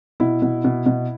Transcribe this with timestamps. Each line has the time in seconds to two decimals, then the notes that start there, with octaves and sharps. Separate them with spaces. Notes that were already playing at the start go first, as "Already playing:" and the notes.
0.20 B2 E4
0.42 B2
0.65 B2
0.86 B2